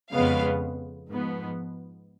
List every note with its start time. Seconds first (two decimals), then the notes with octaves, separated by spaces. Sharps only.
0.11 F2 C#3 G#3 B3 F5
1.09 G#2 F3 B3